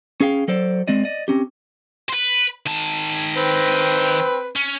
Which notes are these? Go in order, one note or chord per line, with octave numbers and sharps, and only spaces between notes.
C#4 G#4 F5 G5
F#3 A4 C5 D5
G#3 C4 D5 D#5
D5 D#5
C4 C#4 G4
B4 C5
D#3 A5
C4 B4
C#4